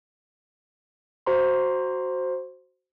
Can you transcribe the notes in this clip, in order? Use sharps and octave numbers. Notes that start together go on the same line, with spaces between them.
F#4 C5 A#5 C6